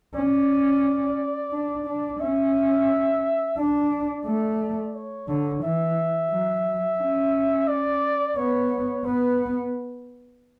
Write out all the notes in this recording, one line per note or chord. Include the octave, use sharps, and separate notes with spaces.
C#4 D5
D4
D4
C#4 E5
D4 D5
A3
C#5
D3 C#5
E3 E5
F#3
C#4
D5
B3 C#5
B3 B4